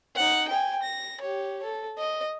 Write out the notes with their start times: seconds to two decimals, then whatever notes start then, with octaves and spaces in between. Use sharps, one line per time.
0.16 D#4 F#5
0.49 G5 G#5
0.83 A#6
1.21 G4 C#5
1.63 A4
1.98 D#5